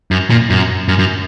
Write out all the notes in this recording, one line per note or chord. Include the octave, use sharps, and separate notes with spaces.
F#2
A#2
F#2
F#2
F#2